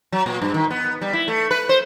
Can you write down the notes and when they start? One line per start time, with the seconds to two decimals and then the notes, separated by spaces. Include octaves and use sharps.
0.12 F#3
0.26 A#2
0.42 G2
0.54 D#3
0.70 B3
1.01 G3
1.13 E4
1.28 A3
1.51 B4
1.69 C5